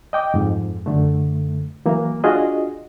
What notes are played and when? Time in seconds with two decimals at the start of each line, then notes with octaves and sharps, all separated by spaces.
0.13 D#5 G5 D6
0.34 F2 G#2
0.86 F#2 D3 A3
1.86 E3 F#3 A#3
2.24 D4 F4 F#4 G#4 D#5